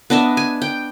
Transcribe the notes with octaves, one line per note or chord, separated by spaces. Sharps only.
B3 D4 D#5 E5
G#5
G5